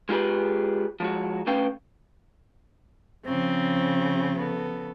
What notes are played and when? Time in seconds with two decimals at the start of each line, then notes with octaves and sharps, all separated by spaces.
0.09 G#3 F4 G4 G#4 B4
1.00 F3 G#3 F#4
1.47 D3 A3 C#4 B4 F5 G5
3.25 C#3 F3 C4
4.39 B3 A4